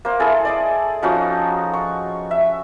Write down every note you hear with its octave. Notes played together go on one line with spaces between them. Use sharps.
A#3 C5
E4 G#4 A4
D5 D#5 D6
F3 C#4 D#4 F#4
C#6
E5